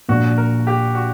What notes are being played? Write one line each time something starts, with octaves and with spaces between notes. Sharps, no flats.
A#1 A#2 A#3 F#4
A#4
G4
F#4